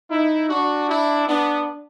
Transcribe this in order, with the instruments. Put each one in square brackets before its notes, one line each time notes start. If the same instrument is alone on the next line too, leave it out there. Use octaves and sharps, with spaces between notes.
[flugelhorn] D#4 [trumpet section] E4
[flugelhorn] D4 [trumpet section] F#4
[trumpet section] E4
[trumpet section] B3 [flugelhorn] D4